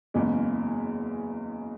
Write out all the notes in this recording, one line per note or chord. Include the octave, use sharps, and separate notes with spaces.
F#1 E2 C#3 G#3